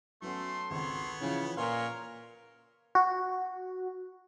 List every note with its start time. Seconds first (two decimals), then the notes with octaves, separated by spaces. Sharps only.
0.22 F#3 A3 B3 C#4 A4 C6
0.70 G#1 C#2 B3 C#5
1.21 C#3 E3 F3
1.57 A#2 A#4 B4 C#5 F5 C6
2.95 F#4